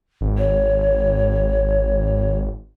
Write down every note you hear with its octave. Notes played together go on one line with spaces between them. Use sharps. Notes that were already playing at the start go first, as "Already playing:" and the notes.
G#1
C#5